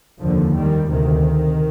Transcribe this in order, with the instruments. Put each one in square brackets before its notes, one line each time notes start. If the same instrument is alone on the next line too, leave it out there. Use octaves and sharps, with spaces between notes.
[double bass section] F1 D#2 D3 F3
D#3 G3
D2 C3 D#3